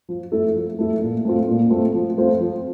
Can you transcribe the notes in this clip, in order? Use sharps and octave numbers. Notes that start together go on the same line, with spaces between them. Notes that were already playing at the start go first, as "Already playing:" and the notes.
F3
A3 E4 A4
F3
A3 E4 A4
A#2
A3 C4 F4
A#2
A3 C4 F4
F3
A3 C4 F4 C5
F3